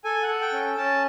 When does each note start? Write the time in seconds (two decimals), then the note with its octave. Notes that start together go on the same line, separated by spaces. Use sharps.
0.04 A4 G#5
0.22 F#5
0.29 A4
0.41 G5
0.53 C#4
0.77 C#4 A5